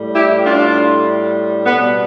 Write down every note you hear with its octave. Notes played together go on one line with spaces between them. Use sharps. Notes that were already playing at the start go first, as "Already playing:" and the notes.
Already playing: A2 G3
E4 G4
D4 F4
B2 G3 B3